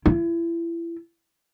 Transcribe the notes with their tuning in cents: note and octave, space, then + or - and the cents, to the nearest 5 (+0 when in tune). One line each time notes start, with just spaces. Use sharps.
E4 +30